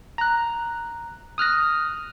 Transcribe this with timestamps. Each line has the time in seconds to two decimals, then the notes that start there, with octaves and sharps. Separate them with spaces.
0.18 A#5 F#6
1.38 D#6 F6 F#6 A#6